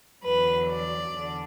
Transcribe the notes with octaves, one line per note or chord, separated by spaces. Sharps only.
E2 D3 F#3 B4
D5
E2 D3